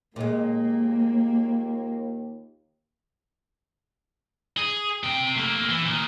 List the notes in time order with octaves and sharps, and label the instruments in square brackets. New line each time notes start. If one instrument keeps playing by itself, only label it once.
[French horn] D#2 [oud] A#2 G#3 [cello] A#3
[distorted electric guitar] G#4
C3 G5
A3 A#3
E3
A#2 D#3